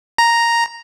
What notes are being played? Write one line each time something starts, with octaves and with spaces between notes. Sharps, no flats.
A#5